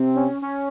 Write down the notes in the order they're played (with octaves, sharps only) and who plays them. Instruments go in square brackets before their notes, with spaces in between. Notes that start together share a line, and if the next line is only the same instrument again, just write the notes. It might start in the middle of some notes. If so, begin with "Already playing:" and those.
Already playing: [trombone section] C3 C4
[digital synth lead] C#4
C#4